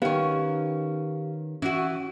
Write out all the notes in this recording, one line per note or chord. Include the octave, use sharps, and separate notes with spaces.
D#3 B3 C#4 G4 C#5 F5
E3 C#4 F#4